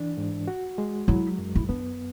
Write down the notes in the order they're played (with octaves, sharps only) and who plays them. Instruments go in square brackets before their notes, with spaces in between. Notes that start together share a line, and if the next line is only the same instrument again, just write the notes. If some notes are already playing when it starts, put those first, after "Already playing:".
Already playing: [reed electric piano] E3 D4
G#2
F#4
G#3
[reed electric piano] F#3 [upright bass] E4
[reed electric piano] F#2
[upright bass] E4
[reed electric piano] B3 [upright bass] D4